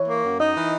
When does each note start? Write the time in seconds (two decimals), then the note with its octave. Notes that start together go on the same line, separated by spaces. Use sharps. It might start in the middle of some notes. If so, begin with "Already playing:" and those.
Already playing: E3 C#5
0.08 A#3
0.24 F#2
0.40 D#4 D#5
0.57 E3